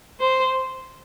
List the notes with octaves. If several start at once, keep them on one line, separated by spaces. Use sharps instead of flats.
C5